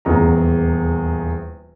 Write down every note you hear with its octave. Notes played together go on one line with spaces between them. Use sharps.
D#1 E2 G#4 A#5